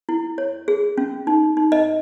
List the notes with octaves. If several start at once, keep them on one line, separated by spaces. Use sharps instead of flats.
E4
C#5
G#4
C#4
D#4
D#4
D#5